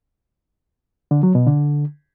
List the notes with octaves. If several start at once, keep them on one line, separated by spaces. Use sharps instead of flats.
D3
F#3
B2
D3